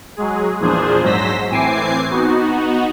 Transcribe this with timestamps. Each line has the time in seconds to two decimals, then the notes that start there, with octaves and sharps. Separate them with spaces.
0.17 F#3 G#3 G#4
0.60 E2 A#2 F3 D4 G#4 C5
1.03 G#2 F#3 C5 E6 A#6 B6
1.50 A2 E3 C4 G#5 D6 C7
2.11 B3 D#4 F#4